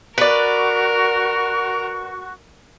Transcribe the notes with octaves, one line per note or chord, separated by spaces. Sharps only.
F#4 A#4 B4 D5 C#6